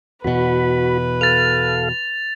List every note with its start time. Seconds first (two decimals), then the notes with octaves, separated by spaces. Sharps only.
0.24 E2 B2 F#4 B4 B5
1.21 A4 F5 A6 F7